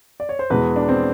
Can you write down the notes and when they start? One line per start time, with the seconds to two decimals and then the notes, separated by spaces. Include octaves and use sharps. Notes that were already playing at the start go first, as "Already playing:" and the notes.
0.20 D5
0.29 C#5
0.39 C5
0.50 E2 B2 G#3 B4
0.76 D4
0.89 C4